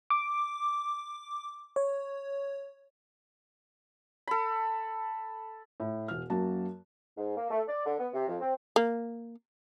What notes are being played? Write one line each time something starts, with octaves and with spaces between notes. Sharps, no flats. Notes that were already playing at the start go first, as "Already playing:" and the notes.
D6
C#5
A4 B5
A2
E1 F6
F#2 F#3 A#3 F#4 A5
G#2
A#3
A3
D5
D3
B3
C3
F2
C4
A#3